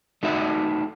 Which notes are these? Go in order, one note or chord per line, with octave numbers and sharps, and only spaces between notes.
A3 D#4 F#4 E5